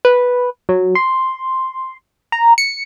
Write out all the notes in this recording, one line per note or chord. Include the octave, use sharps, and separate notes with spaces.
B4
F#3
C6
A#5
C#7